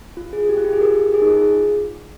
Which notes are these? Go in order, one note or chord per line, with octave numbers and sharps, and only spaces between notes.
F4
G#4
G4
F4
G4
G#4
G4 A#4
G#4
D#4
F4
G#4